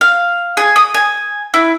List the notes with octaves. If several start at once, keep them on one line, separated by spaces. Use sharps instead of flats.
F5
G#4
D#6
G#5
E4